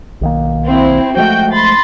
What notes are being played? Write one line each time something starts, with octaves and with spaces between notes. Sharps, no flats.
B1 D#3 A#3
C4 E4
F3 G#3 A3 F#4 G5 G6
B5 C6 A6